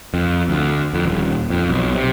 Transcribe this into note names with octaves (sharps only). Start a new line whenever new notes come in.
F2
D2
F2
D#1
F2
B1
C3